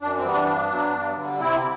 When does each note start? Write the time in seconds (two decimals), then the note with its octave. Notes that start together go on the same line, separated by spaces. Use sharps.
0.02 F#2 D4
0.16 C4
0.24 E3 G3 B3
0.32 D4
0.47 G2
0.70 F#3 B3
0.93 G2
1.16 D3 G3
1.40 C3 C4 E4